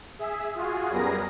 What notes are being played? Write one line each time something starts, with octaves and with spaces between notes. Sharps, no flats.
G#4 E5
F4 F#4 G#4
F#2 G3 B3 G#4 A#4 A#6